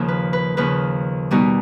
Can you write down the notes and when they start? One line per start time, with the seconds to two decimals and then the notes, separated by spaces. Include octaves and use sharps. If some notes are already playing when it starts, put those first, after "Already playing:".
Already playing: D#2 C#3 F3
0.08 B4
0.33 B4
0.57 D#2 C#3 F3 B4
1.31 B2 G3 B3 D#4